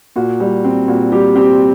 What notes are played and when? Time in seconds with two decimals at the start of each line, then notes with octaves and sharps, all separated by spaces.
0.16 A#2 F#4
0.40 G3
0.64 C4
0.88 A#2 F#4
1.12 G3 G4
1.36 C4 G4